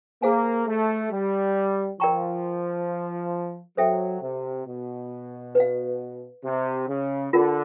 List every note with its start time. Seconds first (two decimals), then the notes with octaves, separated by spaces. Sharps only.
0.22 A#3 G#4 C5 F5 G#5
0.67 A3
1.11 G3
2.00 F3 A#4 D5 G5 A#5 C#6
3.77 F#3 A4 C5 E5 G5
4.22 C3
4.67 B2
5.55 B4 D5 F5
6.45 C3
6.88 C#3
7.33 D3 F4 A#4 D5 F#5